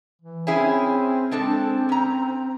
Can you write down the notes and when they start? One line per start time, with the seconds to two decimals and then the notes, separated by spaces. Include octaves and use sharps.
0.21 E3
0.47 C4 C#4 E4 G#4
1.31 G#3 C4 D4 A4
1.89 C#4 A#5